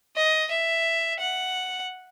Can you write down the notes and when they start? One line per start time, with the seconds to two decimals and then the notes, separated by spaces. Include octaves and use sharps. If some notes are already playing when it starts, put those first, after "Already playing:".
0.17 D#5
0.51 E5
1.20 F#5